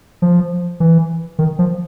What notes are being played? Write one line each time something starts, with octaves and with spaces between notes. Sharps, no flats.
F3
E3
D#3
F3